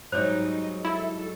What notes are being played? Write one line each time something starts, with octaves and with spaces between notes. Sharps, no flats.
G#2 F#3 G3 D#4 C5 C#5
E4 A4